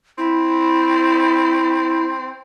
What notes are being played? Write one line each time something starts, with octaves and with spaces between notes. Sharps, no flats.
C4 E4